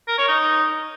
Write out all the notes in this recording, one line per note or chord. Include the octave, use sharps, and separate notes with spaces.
A#4
C#5
D#4